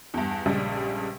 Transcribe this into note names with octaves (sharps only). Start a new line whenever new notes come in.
E2 G2
A#1 G2 C#3 G3 G#3